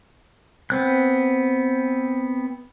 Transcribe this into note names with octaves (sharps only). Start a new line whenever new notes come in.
B3 C4 F#6